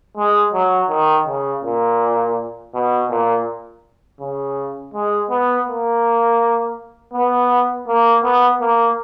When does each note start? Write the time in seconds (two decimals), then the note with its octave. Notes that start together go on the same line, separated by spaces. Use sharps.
0.17 G#3
0.53 F#3
0.90 D#3
1.27 C#3
1.63 A#2
2.74 B2
3.10 A#2
4.20 C#3
4.94 G#3
5.30 B3
5.68 A#3
7.14 B3
7.88 A#3
8.24 B3
8.61 A#3